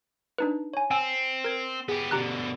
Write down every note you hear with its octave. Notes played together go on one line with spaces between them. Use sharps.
D4 D#4 B4
C#5 G#5
C4 G5 G#5 E6
A#4 G#6
B3 G4 G#4
B2 D3 G4 A#5 F#6